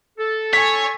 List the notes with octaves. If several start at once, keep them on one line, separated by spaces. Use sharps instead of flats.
A4
C#5 G#5 C#6 B6